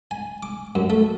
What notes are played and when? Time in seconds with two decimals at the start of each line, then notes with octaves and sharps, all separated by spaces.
0.11 G#5
0.43 D6
0.75 F#2
0.90 A3